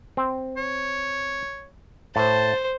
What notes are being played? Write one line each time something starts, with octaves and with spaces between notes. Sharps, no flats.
C4
C#5
A2 C5 A5